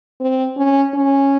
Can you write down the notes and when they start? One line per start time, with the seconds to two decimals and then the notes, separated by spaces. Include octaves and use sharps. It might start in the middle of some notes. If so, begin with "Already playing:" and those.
0.20 C4
0.57 C#4
0.94 C#4